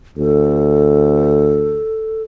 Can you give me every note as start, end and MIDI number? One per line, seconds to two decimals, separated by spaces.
0.18 1.84 38
0.18 2.23 69